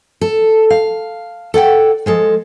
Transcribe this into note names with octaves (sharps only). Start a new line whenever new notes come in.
A4
F5
A4 D5 F#5 G5
F3 G#3 A4